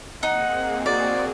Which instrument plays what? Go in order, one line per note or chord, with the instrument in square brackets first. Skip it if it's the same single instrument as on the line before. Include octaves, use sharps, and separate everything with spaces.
[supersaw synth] A#3 C4 G#4 [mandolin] D#4 [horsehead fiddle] F#5
[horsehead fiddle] F#4 [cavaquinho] D5